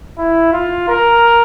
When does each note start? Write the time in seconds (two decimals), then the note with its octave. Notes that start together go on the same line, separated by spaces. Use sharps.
0.18 E4
0.53 F4
0.88 A#4